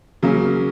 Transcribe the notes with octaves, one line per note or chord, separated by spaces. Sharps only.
C#3 F#3 A#3 C#4